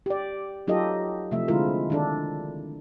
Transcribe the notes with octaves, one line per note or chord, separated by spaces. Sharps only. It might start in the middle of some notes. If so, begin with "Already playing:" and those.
G4 D5
F#3 D#4 F4 G4 A4 D#5
C3 F3 A3 E5
D3 G#3 C4 E4 F4 A#4
D#3 D4 A4